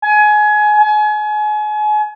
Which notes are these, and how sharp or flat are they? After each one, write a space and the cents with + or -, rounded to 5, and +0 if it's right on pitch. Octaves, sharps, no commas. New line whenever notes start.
G#5 +25
G#5 +35